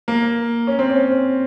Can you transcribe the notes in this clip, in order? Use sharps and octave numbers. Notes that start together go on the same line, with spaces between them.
A#3
C#4
C4
C#4